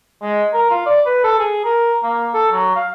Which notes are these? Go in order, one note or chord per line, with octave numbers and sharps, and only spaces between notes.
G#3
A#4
F4
D5
B4
A4
G#4
A#4
A#3
A4
F#3
F5